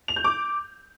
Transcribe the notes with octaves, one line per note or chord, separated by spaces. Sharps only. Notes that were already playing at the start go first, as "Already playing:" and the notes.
F7
G6
D6